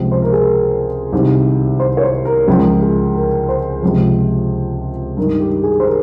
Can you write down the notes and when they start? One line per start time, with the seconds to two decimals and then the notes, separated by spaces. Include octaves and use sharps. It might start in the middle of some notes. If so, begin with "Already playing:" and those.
Already playing: C#2 C3 F3
0.12 C5
0.22 A#4
0.32 G#4
0.43 A#4
1.13 C2 C3 D#3
1.80 C5
1.97 C#5
2.03 C5
2.25 A#4
2.48 C#2 C#3 F3 A#4
2.81 G#4
3.15 A#4
3.49 C5
3.82 C#2 C3 F3
5.17 G2 D#3 A#4
5.40 G4
5.63 G#4
5.80 C5
5.86 A#4